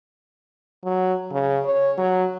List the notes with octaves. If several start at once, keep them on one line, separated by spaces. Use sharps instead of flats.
F#3
C#3
C#5
F#3